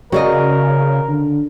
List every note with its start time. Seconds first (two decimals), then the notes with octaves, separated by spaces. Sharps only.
0.12 C#3 F#4 A#4 D5 D#5
1.09 D3